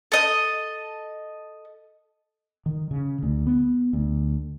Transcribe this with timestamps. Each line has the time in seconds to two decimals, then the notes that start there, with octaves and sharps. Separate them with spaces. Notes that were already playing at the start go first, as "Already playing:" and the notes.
0.12 A4 D#5
2.66 D#3
2.91 C#3
3.23 D2
3.47 B3
3.93 D2